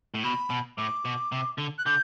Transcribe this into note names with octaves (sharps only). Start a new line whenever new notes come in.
A2
B2 B5
B2
A2 D6
B2
C3
D3
F#6
D3 G6